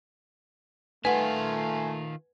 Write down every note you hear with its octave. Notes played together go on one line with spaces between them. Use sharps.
D#3 A3 F4 B4 F#5 G#5